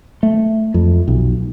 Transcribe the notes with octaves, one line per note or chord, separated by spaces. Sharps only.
A3
F2
B1